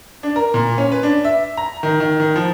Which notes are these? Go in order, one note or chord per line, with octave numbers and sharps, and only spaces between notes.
D4
A#4
A#2
C#4
B4
D4
E5
A#5
D#3
D#3
D#3
F3